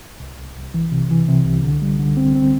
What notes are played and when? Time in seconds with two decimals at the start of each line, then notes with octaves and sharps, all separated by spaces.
0.20 C2
0.39 C2
0.56 C2
0.74 E3
0.92 C3
1.10 E3
1.28 C3
1.46 C2
1.64 D3
1.82 G3
1.99 D3
2.17 C4
2.35 C4